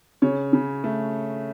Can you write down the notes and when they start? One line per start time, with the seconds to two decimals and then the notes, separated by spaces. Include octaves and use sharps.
0.22 C#3 C#5
0.53 C#3
0.84 A3